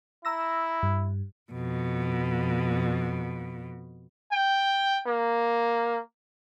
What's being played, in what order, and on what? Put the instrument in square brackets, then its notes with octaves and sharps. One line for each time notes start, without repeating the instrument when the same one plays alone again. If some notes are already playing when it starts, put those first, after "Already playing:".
[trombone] E4 [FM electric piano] A#5 E6 A#6
[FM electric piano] G2
[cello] F2 B2
[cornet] G5
A#3